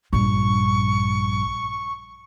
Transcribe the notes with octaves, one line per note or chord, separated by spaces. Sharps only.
A#1 G2 C#6